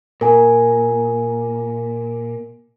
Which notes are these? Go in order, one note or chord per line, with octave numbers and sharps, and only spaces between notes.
A#2 A#4 G#5